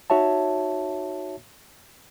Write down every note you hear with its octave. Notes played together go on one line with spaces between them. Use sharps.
D#4 F#4 C#5 E5 A5